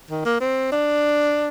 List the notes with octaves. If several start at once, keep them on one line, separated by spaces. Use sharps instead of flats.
D#3
A#3
C4
D4